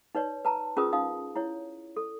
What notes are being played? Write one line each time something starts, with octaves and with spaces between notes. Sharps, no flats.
D#4 B4 C#5 D5
B4 A5 A#5
C#4 F4 G#4 A#4 B4 D#6
D#4 F5 D#6
E4 C#5
A4